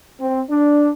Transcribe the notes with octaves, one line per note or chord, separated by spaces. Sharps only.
C4
D4